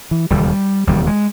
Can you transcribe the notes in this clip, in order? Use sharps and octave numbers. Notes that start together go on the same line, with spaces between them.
E3
E1 D#2 C#3 G3
E1 D#2 C#3 G3
G#3